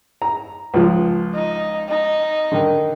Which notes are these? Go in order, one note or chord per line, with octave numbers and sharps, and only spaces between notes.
A#5
C#2 F3
D#4
D#4
D3 D#3